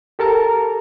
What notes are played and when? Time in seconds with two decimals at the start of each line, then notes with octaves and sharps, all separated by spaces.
0.19 G4 A4 A#4 A5 A#5